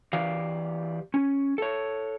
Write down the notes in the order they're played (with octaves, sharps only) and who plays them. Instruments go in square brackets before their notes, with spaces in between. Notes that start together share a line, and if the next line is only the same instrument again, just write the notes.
[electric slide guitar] E3 G4 D5 F5
C#4
A4 C#5